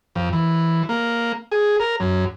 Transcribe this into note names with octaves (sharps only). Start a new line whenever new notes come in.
F2
E3
A#3
G#4
A#4
F#2